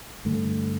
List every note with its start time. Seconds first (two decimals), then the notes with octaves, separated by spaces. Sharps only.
0.25 G2 D3 A3